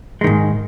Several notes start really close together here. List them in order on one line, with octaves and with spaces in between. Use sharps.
G#3 D#3 G#2